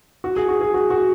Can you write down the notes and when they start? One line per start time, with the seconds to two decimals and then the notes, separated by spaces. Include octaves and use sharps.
0.24 F#4
0.36 G#4
0.49 F#4
0.61 G#4
0.74 F#4
0.90 F#4